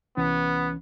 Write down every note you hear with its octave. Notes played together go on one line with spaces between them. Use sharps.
C2 E3 B3 C#4